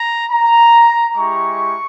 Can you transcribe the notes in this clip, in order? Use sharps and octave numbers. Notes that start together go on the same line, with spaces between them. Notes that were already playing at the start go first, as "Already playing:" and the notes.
Already playing: A#5
A#5
G#3 E4 G4 C#6